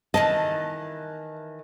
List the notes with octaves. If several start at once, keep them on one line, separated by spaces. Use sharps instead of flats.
D#3 E3 D#5 A5